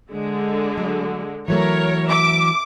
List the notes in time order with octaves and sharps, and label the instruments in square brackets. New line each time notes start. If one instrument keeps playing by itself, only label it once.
[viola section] D3 G#3
[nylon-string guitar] F#3 A3
[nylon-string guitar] E3 F#3 A3 [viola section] A#4 C#5
[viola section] E5 [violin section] D6